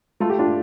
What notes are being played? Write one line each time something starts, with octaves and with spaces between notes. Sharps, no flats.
A3 F4 A4
G4
D4 F4